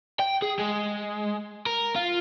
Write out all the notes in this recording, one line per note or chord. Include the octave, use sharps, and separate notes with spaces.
G5
G#4
G#3
A#4
F4